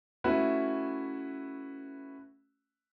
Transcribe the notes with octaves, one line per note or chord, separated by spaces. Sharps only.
A3 C#4 E4 F#4 B4 E5